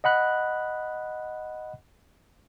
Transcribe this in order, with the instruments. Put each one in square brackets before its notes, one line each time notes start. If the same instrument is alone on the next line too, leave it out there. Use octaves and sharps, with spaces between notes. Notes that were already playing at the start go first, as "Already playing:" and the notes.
[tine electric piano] D#5 F#5 B5 F#6